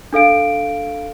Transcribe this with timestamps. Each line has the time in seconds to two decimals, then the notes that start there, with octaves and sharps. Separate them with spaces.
0.13 D4 A4 F5 D7